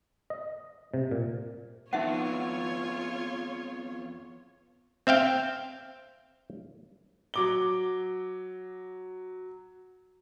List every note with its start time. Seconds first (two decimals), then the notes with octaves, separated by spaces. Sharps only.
0.30 D#5
0.94 C3
1.11 A#2
1.93 F2 B3 D#4 F4 C#5 E5 F#5
5.07 C4 E5 F5 G5
7.34 F#3 D6 G7